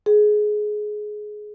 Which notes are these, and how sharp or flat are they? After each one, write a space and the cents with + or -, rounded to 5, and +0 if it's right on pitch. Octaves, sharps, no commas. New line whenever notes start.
G#4 +15